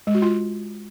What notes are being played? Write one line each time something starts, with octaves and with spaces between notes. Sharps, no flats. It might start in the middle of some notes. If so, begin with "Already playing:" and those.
G#3
F#4
F4